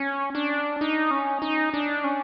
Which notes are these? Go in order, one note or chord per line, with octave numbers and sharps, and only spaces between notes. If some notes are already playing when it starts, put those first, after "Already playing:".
Already playing: C#4
D4
D#4
C#4
D#4
D4
C#4